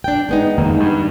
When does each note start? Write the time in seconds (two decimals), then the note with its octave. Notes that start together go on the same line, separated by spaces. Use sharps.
0.04 D4 G5
0.29 G#3 B3 D#4
0.58 F2 D#3 A#3
0.80 G2